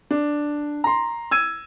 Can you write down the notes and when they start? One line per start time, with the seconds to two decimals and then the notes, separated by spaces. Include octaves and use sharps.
0.11 D4
0.84 A#5 C6
1.31 E6 G#6 D#7